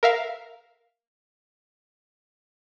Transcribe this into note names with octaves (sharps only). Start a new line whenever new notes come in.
A#4 E5 F5